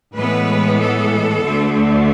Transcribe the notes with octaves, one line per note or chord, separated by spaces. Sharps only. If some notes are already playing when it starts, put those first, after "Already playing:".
A2 E3 G#3 B3 B4
A4
D2 D3 A3